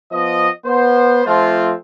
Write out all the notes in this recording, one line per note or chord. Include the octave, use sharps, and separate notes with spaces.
F3 B3 D#5
B3 C5
F3 A3 C4 F4